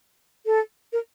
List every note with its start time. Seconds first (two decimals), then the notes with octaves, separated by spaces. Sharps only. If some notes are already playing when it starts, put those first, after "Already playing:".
0.46 A4
0.93 A#4